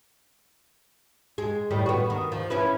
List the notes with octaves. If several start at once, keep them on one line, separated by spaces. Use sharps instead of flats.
G#3
A2 D#3 G3
B3 F#4
D#3
F3
C#4 E4 B4